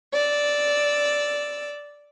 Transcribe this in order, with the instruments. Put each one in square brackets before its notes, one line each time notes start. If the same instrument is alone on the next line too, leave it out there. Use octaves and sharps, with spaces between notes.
[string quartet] D5 E6